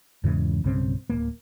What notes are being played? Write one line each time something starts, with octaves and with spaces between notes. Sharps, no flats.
E2 G#2 C#3 E3
B1 G2 C#3 C4
D1 A#3